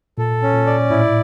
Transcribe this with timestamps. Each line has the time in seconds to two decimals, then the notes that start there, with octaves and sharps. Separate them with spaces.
0.18 A#2 A4
0.42 C#4
0.54 A#2
0.66 D5
0.90 A2 E4